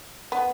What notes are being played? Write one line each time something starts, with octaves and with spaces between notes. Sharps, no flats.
B3